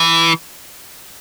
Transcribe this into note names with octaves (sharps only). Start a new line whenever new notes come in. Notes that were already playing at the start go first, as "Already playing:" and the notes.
Already playing: E3